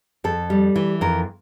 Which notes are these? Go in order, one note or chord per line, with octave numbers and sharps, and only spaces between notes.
F2 A4
G3
E3
F2 A#4